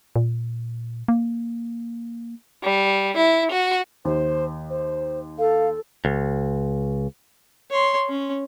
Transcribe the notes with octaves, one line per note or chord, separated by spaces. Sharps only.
A#2
A#3
G3
E4
F#4
D#2 C5
C5
A4 F5
C#2
C#5 C6
C#4